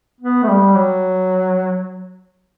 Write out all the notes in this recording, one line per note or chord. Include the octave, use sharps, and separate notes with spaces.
B3
A3
G3
F#3